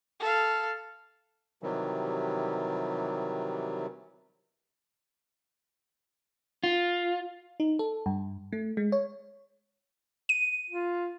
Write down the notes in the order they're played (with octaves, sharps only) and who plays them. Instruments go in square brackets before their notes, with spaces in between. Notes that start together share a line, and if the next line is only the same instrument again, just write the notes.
[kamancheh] A4 F5
[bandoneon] C3 D#3 E3 F#3 G3
[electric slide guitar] F4
[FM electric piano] D#4
A4
G2
A3
G#3
C#5
[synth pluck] D#7
[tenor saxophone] F4